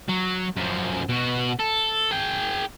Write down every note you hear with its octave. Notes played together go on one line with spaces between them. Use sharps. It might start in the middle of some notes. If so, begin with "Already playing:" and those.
F#3
F#2 F3
B2 F#4
A4
G#4 G5